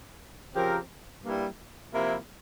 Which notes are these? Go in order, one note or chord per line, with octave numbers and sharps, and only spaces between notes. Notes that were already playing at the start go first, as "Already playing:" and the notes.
C#3 F3 C4 G4 A#4
G2 G3 A#3 E4
C3 F3 A#3 E4